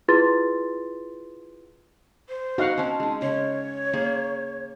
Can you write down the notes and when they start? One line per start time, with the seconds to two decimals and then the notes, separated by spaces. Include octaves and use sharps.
0.08 E4 F4 G#4 B4 C6 A6
2.29 C5
2.58 D#4 F#4 A#4 F5 F#5
2.78 C4 C#4 A5
3.00 G#3 D#4
3.22 C#3 C#5
3.93 A#3 G#4